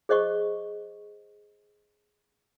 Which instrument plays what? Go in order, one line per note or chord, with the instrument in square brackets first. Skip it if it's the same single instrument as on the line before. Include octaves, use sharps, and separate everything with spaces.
[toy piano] G#4 C5 D#5 C#6